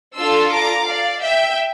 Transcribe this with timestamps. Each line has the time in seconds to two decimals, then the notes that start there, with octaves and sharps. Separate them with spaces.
0.16 D4 F4 A4 C6 E6
0.51 A#5 D6
0.87 D5 F5
1.22 E5 G5